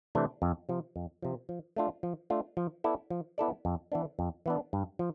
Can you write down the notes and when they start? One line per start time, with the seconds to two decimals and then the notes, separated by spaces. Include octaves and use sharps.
0.15 C3 E3 A3 D4
0.42 F2
0.69 C3 F3
0.96 F2
1.22 C3 F3
1.49 F3
1.76 A3 D4 F4
2.03 F3
2.30 A3 D4 F4
2.57 F3
2.84 B3 E4 A4 D5
3.10 F3
3.38 B3 E4 A4 D5
3.65 F2
3.92 E3 B3 D4
4.19 F2
4.46 E3 B3 D4
4.73 G2
4.99 F3